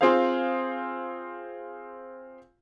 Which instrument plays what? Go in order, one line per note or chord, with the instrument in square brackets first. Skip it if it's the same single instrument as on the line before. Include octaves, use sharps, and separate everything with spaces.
[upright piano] C4 F4 G#4 C5 F5